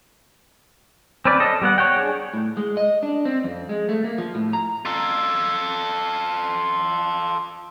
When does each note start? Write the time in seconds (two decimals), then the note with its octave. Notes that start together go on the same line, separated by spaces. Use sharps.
1.25 C4 C#4 B4 D5
1.40 A4 D#5
1.62 G3 B3 F#5
1.78 C#5 F#5 G5
1.96 D4 G#4
2.34 A2
2.57 G#3
2.77 D#5
3.03 D4
3.25 C4
3.44 F2
3.69 G#3
3.89 A3
4.04 A#3
4.18 F3
4.35 A2
4.53 A#5
4.85 F4 A4